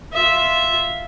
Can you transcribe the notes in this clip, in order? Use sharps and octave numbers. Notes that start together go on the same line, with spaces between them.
F4 E5